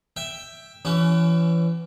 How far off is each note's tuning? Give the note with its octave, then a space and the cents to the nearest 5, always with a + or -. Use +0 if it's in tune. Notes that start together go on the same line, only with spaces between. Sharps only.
E5 +0 G5 +10
E3 +30 C#4 +25 F#4 +40